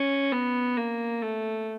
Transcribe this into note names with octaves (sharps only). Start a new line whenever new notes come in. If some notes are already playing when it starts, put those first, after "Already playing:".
Already playing: C#4
B3
A#3
A3